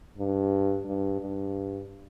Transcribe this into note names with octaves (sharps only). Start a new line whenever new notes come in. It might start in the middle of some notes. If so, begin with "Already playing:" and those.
G2
G2
G2